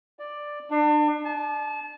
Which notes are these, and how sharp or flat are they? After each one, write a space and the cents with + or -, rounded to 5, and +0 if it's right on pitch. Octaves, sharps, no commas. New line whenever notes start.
D5 +5
D4 +35
A5 -30